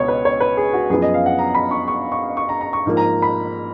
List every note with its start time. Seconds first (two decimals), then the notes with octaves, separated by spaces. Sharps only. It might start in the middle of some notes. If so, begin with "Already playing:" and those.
Already playing: C#2 B2 G#3 B3 C#5
0.08 B4
0.25 C#5
0.40 B4
0.57 G#4
0.73 F#4
0.90 F#2 F3 B3 G#4
1.02 D#5
1.14 F5
1.26 F#5
1.39 A#5
1.55 B5
1.71 C#6
1.88 C#6
2.12 C#6
2.37 C#6
2.49 A#5
2.61 A#5
2.73 C#6
2.86 G#2 F3 A#3
2.97 A#5
3.22 B5